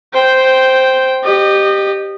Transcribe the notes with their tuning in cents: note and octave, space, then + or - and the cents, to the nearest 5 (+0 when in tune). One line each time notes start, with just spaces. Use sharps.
C5 +0 G5 -5
G4 +0 D#5 -25